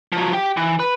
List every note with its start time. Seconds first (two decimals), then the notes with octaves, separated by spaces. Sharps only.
0.12 F3 F#3
0.33 G4 G5
0.57 E3
0.79 B4